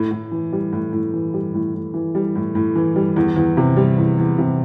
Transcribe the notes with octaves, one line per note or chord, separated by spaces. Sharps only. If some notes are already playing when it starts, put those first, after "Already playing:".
Already playing: A2
A2
E3
G3
A2
A2
E3
G3
A2
A2
E3
G3
A2
A2
E3
G3
E2
E2
C3
G3
E2
E2
C3